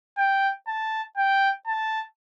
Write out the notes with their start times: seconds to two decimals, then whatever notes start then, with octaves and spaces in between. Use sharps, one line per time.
0.18 G5
0.68 A5
1.17 G5
1.68 A5